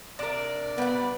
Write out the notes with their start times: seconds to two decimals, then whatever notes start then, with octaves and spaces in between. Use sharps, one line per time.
0.19 C3 D4 A#4 D5
0.78 G3 B3 F#5